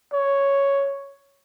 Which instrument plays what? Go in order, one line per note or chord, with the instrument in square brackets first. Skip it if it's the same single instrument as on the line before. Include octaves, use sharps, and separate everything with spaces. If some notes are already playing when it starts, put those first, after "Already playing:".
[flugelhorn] C#5